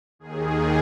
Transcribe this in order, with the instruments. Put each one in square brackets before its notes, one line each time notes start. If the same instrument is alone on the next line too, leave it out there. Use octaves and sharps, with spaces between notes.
[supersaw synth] D#2 D#3 G#4